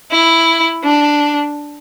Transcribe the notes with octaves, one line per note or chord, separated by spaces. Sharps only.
E4
D4